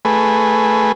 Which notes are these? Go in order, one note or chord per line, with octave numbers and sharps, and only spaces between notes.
A3 G#4 B4